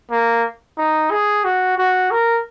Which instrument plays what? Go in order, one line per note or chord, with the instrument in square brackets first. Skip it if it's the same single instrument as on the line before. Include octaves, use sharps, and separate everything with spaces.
[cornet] A#3
D#4
G#4
F#4
F#4
A#4